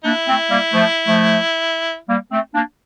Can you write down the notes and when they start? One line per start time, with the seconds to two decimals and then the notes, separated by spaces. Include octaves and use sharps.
0.04 A#3 D4 E4
0.27 A3 C4
0.50 G3 A#3
0.72 F3 A3
1.07 F3 A3
2.09 G3 A#3
2.31 A3 C4
2.54 A#3 D4